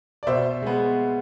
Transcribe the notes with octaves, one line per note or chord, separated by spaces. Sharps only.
D5
B2 C5 E5
G#3 B3